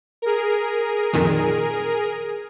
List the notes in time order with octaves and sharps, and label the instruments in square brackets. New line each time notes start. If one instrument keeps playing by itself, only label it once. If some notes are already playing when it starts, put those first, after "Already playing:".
[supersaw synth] G#4 A#4
[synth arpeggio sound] F2 A#2 D#3